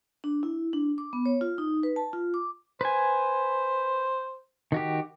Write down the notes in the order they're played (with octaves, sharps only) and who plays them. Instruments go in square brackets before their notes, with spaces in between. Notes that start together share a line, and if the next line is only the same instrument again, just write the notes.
[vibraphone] D4
E4
D4
D6
B3
C#5
F4
D#4
B4
A5
F4
D6
[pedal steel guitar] B4 G#5 [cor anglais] C5
[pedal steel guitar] D#3 F#4 G4